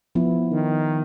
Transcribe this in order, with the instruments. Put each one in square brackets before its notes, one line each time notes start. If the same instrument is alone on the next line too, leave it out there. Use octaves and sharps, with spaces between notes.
[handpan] F3 B3 E4
[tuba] D#3